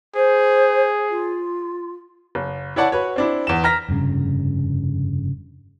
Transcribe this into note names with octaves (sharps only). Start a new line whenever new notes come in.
G#4 C5
F4
F#1
E4 C#5 D5 F#5 A5
F#4 B4 C#5
C4 D4 E4
E2 E7
A#5 F6 A#6 B6
F1 G2 A#2 C#3